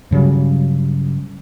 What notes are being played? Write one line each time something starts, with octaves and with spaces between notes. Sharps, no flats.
G2 C#3 F#3 G3